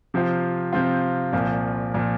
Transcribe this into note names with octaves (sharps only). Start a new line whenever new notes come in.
C3 F3 C4 F4
C3 F3 C4 F4
C2 A#2 F3
A#2 F3